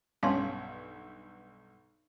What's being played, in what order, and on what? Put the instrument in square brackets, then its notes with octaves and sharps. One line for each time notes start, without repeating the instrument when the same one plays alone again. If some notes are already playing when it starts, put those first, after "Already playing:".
[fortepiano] B1 G2 [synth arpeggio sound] C#4 [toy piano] F5 A5 C6